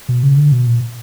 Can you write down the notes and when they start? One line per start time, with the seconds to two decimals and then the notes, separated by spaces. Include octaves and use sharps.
0.09 B2
0.23 C#3
0.37 D3
0.52 B2
0.67 A#2